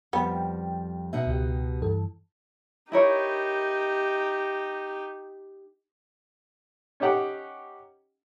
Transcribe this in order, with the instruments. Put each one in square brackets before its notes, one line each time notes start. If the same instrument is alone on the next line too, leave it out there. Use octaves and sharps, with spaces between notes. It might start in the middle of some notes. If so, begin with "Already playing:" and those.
[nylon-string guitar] F2 G3 [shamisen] B3 [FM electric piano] G5
[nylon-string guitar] B2 D#4 F#5 [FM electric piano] E5
[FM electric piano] C#2 G4
G2 E3 A4
[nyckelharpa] D#4 G4 [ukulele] E4 A#4 C#5
[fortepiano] C#4 D#4 G4 F#5